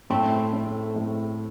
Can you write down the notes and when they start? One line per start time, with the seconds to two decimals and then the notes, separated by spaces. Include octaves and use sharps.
0.10 A2 A3 C4
0.53 A2
0.96 A2